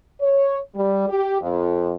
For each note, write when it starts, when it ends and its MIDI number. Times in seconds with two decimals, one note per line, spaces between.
0.21 0.58 73
0.75 1.07 55
1.09 1.40 67
1.41 1.94 41